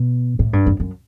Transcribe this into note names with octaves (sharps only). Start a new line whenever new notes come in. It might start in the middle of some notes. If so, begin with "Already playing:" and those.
Already playing: B2
A2
G2
F#2
F#2